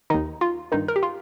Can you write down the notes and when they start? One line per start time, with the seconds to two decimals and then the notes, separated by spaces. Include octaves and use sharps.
0.10 D#2 D#3 D#4
0.41 F4
0.72 G2 D#3 D#4
0.88 A#4
0.96 G4
1.03 F4